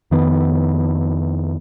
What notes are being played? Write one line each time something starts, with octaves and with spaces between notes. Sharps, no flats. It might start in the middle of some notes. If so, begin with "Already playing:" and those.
F2 D#3 B3